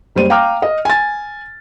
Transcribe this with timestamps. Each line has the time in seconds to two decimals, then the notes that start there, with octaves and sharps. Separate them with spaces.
0.15 F#1 G3 C5 D#7
0.30 F5 G5 A#5 D6 F6
0.62 D#5
0.85 G#5 A6